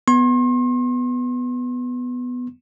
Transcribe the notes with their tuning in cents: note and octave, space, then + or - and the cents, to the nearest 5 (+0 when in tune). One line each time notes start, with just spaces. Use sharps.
B3 +5 C6 +40